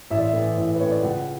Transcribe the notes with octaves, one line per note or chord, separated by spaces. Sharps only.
A1 E5
D5
E5
A2 E3
A1
B4
A2 E3 C#5
D5
C#2 F#5